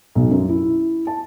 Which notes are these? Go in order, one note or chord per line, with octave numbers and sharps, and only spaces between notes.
B1
F#2
E4
A5